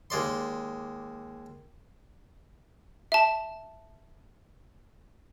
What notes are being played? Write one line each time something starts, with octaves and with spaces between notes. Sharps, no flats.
D#2 G#3 D5 C6
E5 A5